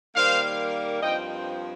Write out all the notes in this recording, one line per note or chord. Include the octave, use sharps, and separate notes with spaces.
D#3 G3 A#3 C5 F5
G2 F3 C4 D#5 G5